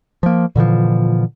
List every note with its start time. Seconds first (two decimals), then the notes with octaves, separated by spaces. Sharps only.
0.23 F3 A#3
0.56 A#2 D3 E3 F3